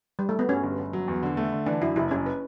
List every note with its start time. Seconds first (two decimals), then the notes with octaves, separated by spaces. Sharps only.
0.19 G3
0.29 A3
0.39 B3
0.49 G2 C#4
0.64 G1
0.79 G1
0.93 F#3
1.08 E2
1.23 D3
1.37 A3
1.52 D3
1.66 E3 D4
1.81 F#2 E4
1.96 F#1 E4
2.11 F#1 C#4
2.26 B4